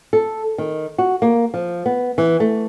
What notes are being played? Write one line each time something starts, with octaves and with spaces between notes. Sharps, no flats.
A4
D#3
F#4
A#3
F3
B3
E3
A3